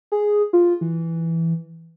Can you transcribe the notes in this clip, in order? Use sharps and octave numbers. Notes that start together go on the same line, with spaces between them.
G#4
F4
E3